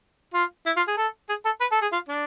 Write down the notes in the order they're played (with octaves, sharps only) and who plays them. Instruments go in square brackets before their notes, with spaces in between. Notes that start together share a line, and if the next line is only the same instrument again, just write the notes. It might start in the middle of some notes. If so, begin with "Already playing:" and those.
[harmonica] F4
E4
F4
G#4
A4
G#4
A4
B4
A4
G#4
F4
D4